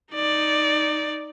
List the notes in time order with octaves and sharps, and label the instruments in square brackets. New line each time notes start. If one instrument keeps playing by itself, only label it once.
[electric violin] D#4 D5